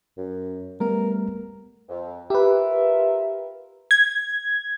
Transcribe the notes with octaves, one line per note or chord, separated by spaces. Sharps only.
F#2
G3 A3 B3 A#4
F2
F4 G4 A#4 B4 E5
G#6